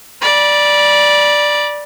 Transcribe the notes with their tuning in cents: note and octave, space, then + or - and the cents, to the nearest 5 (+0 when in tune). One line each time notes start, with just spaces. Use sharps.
D5 +0 B5 -35